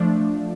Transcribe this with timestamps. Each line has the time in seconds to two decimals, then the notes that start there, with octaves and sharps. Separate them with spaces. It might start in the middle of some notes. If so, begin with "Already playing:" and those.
Already playing: F3 A3 D4